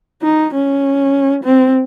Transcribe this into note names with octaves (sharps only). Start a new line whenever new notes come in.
D#4
C#4
C4